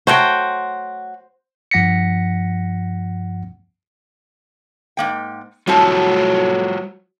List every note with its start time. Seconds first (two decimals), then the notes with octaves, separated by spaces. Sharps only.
0.07 F#3 A3 F#4 C5 G5
1.71 G2 F3 F#5 A#6 B6 C#7
4.97 G#2 A#3 G5
5.67 A2 F#3 G3 C4 F4 F#4 A5